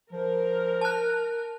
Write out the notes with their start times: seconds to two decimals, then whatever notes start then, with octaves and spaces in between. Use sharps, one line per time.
0.12 F3 A#4
0.81 A5 F#6